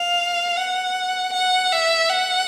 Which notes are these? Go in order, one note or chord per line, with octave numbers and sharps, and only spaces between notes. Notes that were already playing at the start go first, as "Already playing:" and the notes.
Already playing: F5
F#5
F#5
E5
F#5